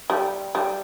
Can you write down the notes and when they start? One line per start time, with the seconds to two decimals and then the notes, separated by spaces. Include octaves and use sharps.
0.10 G3
0.55 G3